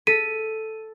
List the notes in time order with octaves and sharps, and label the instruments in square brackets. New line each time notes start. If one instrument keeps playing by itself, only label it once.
[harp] A4 B6 C#7 [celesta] D#7